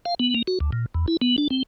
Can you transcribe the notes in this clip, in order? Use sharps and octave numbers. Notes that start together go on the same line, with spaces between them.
F5
B3
A#3
F#4
D2
A#2
E2
E4
B3
D4
C4